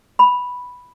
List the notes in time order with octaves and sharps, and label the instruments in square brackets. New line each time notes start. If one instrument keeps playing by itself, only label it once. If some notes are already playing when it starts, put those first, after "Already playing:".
[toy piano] B5